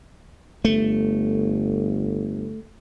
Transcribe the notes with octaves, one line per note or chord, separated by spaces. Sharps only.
G1 A3